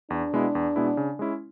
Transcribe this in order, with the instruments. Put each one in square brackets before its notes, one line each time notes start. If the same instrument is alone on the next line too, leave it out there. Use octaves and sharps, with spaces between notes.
[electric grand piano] E2 [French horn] D4
[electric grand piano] B2 G#3 B3 E4
E2
B2 G#3 B3 E4
C#3
G#3 C#4 E4